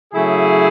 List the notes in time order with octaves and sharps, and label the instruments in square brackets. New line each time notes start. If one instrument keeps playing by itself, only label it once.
[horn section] C#3 F#3 A3 E4 G#4